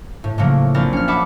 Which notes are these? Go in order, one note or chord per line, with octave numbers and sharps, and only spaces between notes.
A2
A2 C#3 F3 F#3 A3 A#3
A#1 C4 A#4 A6
C#4 F6
E5 F#5 A5 B5 D6